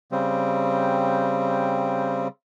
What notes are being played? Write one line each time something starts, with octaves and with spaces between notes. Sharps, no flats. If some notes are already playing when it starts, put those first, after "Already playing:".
C#3 G3 C4